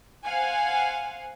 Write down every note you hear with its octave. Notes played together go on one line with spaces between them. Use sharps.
C5 F5 F#5 G#5